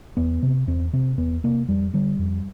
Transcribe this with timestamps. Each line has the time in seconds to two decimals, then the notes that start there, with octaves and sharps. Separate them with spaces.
0.17 E2 B3
0.43 C3
0.67 E2 C4
0.93 C3 C4
1.17 E2 B3
1.44 C3 A#3
1.68 F2 G3
1.93 D3 G3
2.19 F2